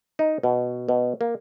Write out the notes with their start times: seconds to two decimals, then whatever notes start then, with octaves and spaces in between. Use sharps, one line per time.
0.19 D#4
0.43 B2
0.89 B2
1.21 A#3